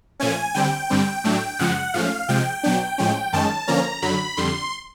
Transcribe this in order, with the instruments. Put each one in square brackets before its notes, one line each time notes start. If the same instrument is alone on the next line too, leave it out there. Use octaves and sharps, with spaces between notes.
[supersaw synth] A#2 F3 A3 C#4 G#5
D3 G3 C4 G5
G2 D3 G3 C4
A2 F#3 A3 D4
F#2 C#3 F3 G#3 F#5
G#2 F3 A3 C#4 F5
C3 F3 G#3 G5
B2 F#3 B3 D4
A2 F3 G#3 C#4
F#2 D#3 G#3 C#4 A5
D3 F3 A#3 C#4 A#5
F#2 D3 F#3 B5
F2 D3 G3 C6